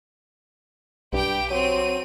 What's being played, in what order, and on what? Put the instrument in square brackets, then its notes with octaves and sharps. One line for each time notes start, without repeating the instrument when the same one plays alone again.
[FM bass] B1 [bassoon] G2 [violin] G4 G5
[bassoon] F#3 [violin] C4 D#7